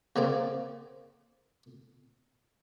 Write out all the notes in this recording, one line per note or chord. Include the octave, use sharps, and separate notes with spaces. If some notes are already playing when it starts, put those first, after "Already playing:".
C#3 A#3 C4 D5